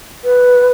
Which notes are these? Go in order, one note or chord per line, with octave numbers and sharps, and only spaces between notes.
B4